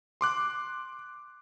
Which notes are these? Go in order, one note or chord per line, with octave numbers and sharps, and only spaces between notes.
C6 D6 F#6